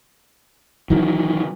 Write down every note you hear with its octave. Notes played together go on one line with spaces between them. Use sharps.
D#3 E3 F#3